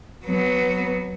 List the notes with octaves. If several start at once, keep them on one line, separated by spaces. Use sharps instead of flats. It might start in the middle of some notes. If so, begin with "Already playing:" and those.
F#3 B3